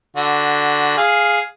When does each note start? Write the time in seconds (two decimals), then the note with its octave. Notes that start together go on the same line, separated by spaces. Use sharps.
0.17 D3 F#4
0.97 G#4 F5